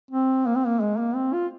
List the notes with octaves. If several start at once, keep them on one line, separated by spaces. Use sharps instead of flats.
C4
A#3
C4
A#3
G#3
A#3
C4
F4